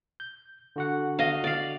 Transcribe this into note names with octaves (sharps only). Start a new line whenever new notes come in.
G6
D3 F#4 F#5
D#5 F5
D5 F5